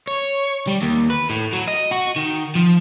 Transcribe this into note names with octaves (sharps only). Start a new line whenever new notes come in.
C#5
G3
D#2
B4
A2
F#3
D#5
F#4
D#3
F3